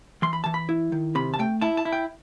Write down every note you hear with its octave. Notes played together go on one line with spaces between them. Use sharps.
E3 C6
B5
E3 A5
B5
E4
D#3
C3 B5
A5
A3 G5
E4 A5
A5
E4
G5